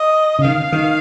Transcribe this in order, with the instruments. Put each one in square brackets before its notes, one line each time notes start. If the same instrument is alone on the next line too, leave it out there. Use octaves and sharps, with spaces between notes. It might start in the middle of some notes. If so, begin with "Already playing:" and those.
Already playing: [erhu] D#5
[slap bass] C#3
[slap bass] D#3 [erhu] F5
[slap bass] D#3